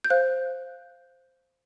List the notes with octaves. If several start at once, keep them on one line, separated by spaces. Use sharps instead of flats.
G6
C5 F5 F#6